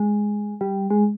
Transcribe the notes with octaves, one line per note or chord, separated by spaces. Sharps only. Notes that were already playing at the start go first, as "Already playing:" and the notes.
Already playing: G#3
G3
G#3